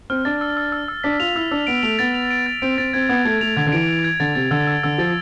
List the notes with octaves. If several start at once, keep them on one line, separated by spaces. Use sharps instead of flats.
C4 F6
D4 A6
E6
E6
E6
E6
D4 B6
F4 F7
E4 E6
D4 E6
B3 D7
A3 F7
B3 A6
F7
D7
A6
C4 D7
C4 A6
C4 G#6
B3 G#6
A3 G#6
A3 F7
D3 G#6
D3
E3 D7
F7
G#6
D3 A6
C3 A6
D3 E6
E6
D3 E6
F3 A6